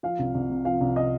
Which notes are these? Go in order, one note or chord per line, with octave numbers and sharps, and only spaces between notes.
F3 F5
C2
C2
C3
F3 F5
C2
D#5